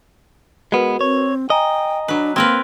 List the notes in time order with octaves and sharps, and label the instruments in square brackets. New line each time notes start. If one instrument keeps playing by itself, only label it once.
[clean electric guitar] G#3 B3 [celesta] F#4 A#4 B4
[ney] C4 [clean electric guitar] C#5
[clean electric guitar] D#5 [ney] G5 [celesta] G#5 A#5
[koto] F#3 B4 [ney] D4
[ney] A#3 [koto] C4 A#4 B4 [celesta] C6 F6 G#6